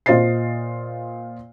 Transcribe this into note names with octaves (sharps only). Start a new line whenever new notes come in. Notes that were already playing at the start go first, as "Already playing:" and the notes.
A#2 F4 C5 D#5 A6 C7